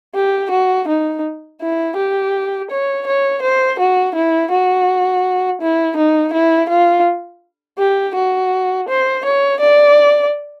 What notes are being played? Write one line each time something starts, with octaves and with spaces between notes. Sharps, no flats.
G4
F#4
D#4
E4
G4
C#5
C#5
C5
F#4
E4
F#4
E4
D#4
E4
F4
G4
F#4
C5
C#5
D5